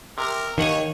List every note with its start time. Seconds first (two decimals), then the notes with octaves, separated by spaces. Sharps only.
0.18 C3 A#4
0.58 D#2 D#3 C#5 F#5 G#5